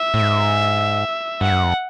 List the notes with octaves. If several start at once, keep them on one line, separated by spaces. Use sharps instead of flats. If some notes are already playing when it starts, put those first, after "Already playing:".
Already playing: E5
A2
G#2
G2 F#5
F#2
F2